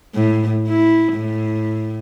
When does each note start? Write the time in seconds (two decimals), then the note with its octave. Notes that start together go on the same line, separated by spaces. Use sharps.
0.15 A2
0.68 E4
1.14 A2